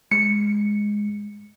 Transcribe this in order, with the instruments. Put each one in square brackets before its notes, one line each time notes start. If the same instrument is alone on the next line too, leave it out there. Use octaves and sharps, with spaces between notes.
[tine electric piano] G#3 [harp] C#7